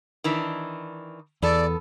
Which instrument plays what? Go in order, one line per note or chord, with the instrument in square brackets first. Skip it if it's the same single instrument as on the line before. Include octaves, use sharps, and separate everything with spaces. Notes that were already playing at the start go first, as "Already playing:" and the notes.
[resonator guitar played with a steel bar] D#3 E3 D4
[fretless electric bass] E2 [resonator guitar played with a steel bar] B3 A4 [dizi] D5